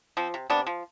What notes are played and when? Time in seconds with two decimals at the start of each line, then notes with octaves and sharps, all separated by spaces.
0.17 F3 C4
0.34 C3
0.50 C3 B3 D4
0.67 F3